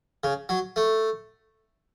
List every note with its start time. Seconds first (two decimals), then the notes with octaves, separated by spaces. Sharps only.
0.24 C#3
0.49 F#3
0.76 A3